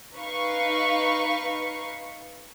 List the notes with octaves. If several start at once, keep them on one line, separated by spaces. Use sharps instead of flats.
D#4 B4 F5 C#6